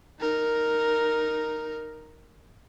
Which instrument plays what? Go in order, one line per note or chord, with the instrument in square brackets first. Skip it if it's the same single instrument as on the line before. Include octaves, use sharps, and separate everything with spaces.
[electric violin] D#4 A#4